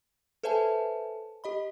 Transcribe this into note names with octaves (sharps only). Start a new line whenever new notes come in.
A4 B4 C5 E5 G#5 A5
G4 D#5 B5